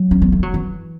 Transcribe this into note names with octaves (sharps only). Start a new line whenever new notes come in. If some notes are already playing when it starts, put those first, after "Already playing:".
Already playing: F#3
C#4
B3
A3
F#3
E3